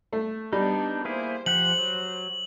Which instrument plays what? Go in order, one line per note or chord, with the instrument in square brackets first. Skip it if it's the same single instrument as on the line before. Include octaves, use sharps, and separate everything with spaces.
[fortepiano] A3
[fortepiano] G3 [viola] B3 D4 [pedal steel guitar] D#4
[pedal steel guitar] A#3 E4 G#4 [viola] C5
[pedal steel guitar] F3 G4 F#5 [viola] C5 [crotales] F#7
[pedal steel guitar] F#3